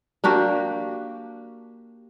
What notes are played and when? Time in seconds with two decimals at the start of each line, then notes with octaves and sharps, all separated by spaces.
0.24 A#3 D4 F#4 G4